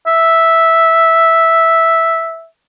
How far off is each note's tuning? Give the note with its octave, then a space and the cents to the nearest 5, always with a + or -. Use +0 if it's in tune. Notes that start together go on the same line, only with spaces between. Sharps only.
E5 -5